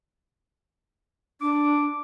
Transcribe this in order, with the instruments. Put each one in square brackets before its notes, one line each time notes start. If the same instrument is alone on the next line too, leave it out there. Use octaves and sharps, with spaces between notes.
[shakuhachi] D4 [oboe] D6